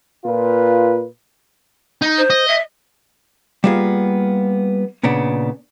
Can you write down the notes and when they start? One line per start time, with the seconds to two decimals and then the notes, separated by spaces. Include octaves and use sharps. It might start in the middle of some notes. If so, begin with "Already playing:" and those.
0.25 A#2 F4 B4
2.02 D#4
2.18 C5
2.30 D#5
2.48 E5
3.64 G3 A#3 B3 F4 G#4
5.03 A#2 C#3 B3 D4